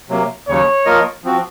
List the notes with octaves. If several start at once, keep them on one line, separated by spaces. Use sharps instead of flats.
C3 F#3 A#3
D#2 C#3 F#3 C#5
F3 A#3 F4 A#4 D#5
F3 C4 F#4